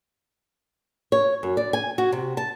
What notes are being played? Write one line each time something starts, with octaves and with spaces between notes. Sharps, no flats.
C#5
F#2
D5
G#5
F#4
C3
A5